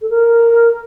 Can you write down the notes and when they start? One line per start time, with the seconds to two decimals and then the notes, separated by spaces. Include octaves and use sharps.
0.01 A4
0.10 A#4